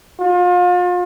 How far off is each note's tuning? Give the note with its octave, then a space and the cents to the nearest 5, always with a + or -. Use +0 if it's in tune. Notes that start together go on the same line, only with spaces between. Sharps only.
F4 +35